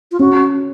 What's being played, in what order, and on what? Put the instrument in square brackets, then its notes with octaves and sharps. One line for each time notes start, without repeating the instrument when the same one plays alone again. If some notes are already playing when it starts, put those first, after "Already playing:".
[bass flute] F4
[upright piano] C#4 [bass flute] F#4